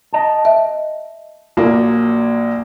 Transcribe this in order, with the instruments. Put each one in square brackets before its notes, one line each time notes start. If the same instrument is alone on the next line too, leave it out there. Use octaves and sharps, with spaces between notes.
[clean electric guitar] D#5 A5
[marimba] E5
[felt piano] A#1 F#3 A#3